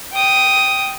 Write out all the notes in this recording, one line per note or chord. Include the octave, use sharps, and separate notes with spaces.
G5 D#6